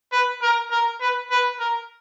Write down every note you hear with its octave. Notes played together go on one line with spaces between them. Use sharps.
B4
A#4
A#4
B4
B4
A#4